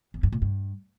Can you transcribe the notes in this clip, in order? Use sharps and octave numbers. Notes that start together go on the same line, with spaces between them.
E2
G2
A#2
G2